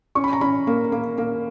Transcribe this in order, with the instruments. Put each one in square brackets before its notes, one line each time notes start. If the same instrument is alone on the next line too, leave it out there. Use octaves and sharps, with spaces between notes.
[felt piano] C#4 C#6
B5
A#5
C#4 B5
A#3
A#3
A#3